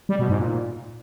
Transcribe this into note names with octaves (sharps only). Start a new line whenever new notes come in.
G3
B2
G#2
A#2